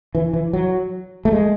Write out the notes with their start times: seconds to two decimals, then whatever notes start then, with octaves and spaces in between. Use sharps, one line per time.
0.15 E3
0.33 E3
0.53 F#3
1.25 A3
1.32 G#3